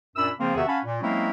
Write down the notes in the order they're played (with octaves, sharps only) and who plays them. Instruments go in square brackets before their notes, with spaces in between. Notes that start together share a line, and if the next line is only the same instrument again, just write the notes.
[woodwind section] F#2 A#2 D4 B5 E6
C#3 F3 A#3 C4
E2 C3 D#3 F#4 G#4 E5
C#4 F5 F#5 G#5 A5 B5
A#2
F#3 G#3 A#3 C4 C#4 E4